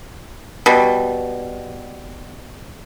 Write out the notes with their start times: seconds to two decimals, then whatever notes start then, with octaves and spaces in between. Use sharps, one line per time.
0.66 B2 G3